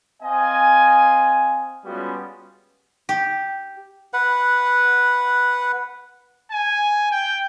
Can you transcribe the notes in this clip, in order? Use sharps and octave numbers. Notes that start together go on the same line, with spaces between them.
C4 D#5 F5 G#5
G3 G#3 B3 C#4 F4 F#4
G4
B4 F#5
G#5
G5